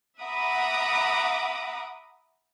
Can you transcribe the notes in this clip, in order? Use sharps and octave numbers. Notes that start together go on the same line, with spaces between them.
E5 F#5 A#5 B5 D6 D#6